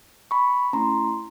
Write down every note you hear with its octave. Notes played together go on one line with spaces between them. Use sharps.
B5 C#6
A3 C#4 E4 A#5 C6